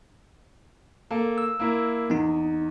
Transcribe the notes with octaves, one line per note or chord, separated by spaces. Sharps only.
A#3 A4
E6
A#3 E4 A#4
E2 B3 D#4